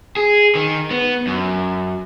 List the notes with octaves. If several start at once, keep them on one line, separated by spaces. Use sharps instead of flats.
G#4
D#3
B3
F#2